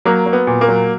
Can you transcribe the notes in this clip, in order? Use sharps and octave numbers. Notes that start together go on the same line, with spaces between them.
F#3 A#3
F#3
B3
A#2
A#3
F#3